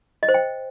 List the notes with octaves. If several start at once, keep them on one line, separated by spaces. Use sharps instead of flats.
D#5
C5
G5